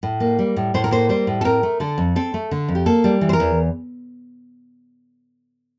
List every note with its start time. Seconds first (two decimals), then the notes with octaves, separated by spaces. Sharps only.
0.03 A2
0.20 A#3
0.39 G3
0.56 A2
0.74 A2 C5
0.84 A#4
0.91 A#3 C5
1.09 G3 C5
1.27 A2
1.41 A4
1.44 C4 A#4
1.63 A3
1.80 D3 A4
1.98 F2
2.16 C4 A4
2.34 A3
2.51 D3
2.68 F2
2.75 G4
2.86 A#3 A4
3.04 G3
3.21 E3
3.29 C5
3.33 A#4
3.40 E2